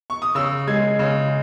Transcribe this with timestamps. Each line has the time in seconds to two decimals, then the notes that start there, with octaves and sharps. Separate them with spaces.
0.10 C#6
0.22 D#6
0.35 C#3 E6
0.67 G#3 G#6
0.99 C#3